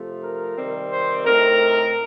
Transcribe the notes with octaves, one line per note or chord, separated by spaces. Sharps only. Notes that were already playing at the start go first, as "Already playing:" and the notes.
Already playing: C3 F3 A3
A#4
C3 D#3 G3 C4
C5
A2 A3 C4 D#4 A#4